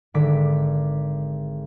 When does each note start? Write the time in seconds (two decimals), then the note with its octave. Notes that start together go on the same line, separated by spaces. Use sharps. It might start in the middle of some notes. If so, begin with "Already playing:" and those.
0.14 G#1 D3 D6 B6